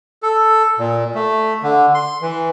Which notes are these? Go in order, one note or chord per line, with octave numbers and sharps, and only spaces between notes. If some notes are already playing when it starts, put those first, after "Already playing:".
A4
A#2
A3
D3
C6
E3